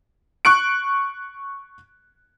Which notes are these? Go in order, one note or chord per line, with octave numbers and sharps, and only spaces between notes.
C#6 F#6 D7